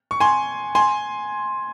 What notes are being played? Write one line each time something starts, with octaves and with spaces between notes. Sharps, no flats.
C#6
G#5 C6
G#5 C6